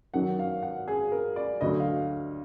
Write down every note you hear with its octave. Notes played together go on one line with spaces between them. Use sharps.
F#2 D#3 F#3 F#5
F5
F#5
G#4
A#4
D5
D2 D3 F#3 D#5
F5